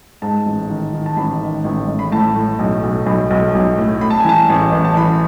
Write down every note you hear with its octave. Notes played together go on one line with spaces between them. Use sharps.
G#2 A5
A1
D#3
D#3
A5
A1 B5
D#3
A1
A1
B5
A2 A5
A2
B1
B1
B1 B5
B1
B1
A2
A2 B5
A5
G#5
E3 A5
A1
A1
A5
E3 B5